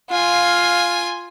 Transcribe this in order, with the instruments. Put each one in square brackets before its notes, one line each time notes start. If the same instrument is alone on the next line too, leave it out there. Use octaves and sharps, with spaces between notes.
[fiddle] F4 G#5 [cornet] F5